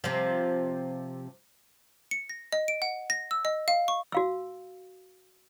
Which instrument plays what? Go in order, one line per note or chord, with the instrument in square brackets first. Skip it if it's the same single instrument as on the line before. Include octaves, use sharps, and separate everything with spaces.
[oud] C3 F3
[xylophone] C#7
A#6
D#5
D7
F#5
A#6
E6
D#5
F5
C#6
[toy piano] F#4 F5 E6